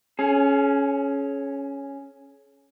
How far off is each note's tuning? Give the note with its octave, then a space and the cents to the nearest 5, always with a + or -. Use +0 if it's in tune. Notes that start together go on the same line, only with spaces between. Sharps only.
C#4 +0 G#4 +35